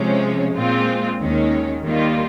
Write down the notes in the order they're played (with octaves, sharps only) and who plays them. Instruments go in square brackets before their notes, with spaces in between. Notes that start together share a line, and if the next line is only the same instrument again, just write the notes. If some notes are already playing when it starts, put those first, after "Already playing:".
Already playing: [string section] C3 F3 G#3 C#4
A#2 G#3 C4 F4
D#2 D#3 G#3 C#4
D#2 D#3 G3 A#3 F4